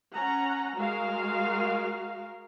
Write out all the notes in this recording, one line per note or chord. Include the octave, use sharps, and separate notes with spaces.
C#4 F#5 A#5
G#3 F#4 A#4 F5